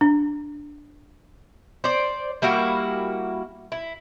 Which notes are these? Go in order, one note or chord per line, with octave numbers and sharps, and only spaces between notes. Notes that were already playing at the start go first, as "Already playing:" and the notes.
D4
C5 D5
G3 A#3 E4 F#4
E4